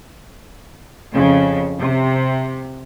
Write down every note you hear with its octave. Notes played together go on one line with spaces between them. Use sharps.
F2 C#3
C3